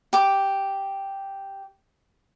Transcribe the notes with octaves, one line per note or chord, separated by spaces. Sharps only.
G4 D6